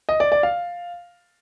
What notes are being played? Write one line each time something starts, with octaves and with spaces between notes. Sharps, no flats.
D#5
D5
D5
F5